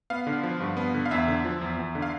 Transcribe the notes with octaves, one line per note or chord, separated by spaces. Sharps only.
B3 F5
D3
F3
G2
B3
D3
F5
E2 E5
D3
F3
E2
E2
D3
F5